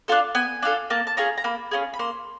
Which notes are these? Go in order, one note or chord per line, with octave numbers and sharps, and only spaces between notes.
D4 F4 A4
B3 G#5
D4 F4 A4
A#3 A5
A5
C#4 F4 G#4 A#5
A#5
A#3 B5
C#4 F4 G#4
B5
A#3 C6